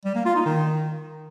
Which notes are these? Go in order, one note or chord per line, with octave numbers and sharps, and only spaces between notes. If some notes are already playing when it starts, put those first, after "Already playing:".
G3
A#3
F4
D#4
D#3